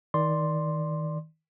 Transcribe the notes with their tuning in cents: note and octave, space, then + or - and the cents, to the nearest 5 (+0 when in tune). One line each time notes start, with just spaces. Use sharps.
D#3 +25 D5 +0 C6 +0